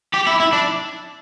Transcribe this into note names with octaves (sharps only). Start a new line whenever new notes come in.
G4
E4
E4
D4